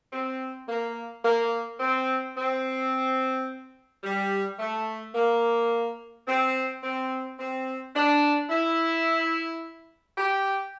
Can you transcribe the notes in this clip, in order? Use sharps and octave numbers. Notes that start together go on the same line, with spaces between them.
C4
A#3
A#3
C4
C4
G3
A3
A#3
C4
C4
C4
D4
E4
G4